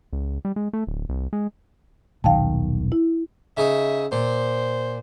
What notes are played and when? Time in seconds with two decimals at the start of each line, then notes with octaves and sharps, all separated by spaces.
0.13 C#2
0.45 G3
0.56 G#3
0.73 A3
0.87 D1
1.09 C2
1.33 G#3
2.24 D#1 B1 D#3 F5 G5 A5
2.92 E4
3.57 C#3 D#4 E5
4.12 A#2 C5